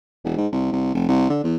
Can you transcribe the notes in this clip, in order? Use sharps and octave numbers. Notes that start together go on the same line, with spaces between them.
E1
G#2
C2
C2
F1
C2
D3
E2